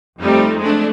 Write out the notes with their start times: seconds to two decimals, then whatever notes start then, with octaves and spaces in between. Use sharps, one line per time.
0.20 F2 G3 A3 C4 D#4
0.59 G#3 A3 D4